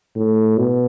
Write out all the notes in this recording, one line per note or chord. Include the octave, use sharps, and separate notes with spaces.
A2
B2